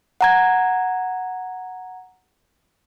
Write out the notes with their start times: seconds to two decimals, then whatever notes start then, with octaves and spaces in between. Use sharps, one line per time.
0.21 F#5 A#5 G#6